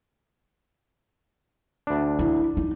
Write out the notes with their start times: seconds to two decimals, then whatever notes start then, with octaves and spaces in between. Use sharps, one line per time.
1.87 D2 D4
2.19 E4
2.57 D#4